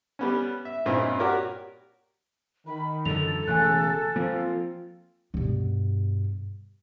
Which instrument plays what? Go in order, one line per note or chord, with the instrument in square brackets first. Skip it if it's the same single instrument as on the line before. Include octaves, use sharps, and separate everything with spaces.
[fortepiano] G3 B3 C#4
E5
G2 A#2 C4 C#4 D#4 E4
F#4 G4 A#4 C#5 D5
[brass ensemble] D#3 [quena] B5
[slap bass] F#2 D3 E3 [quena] A4 [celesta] F7
[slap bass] E1 E3 A3 [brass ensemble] C#3 [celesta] G#5 F#6
[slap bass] F3 A#3 [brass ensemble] C4 F4
[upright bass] G2 B2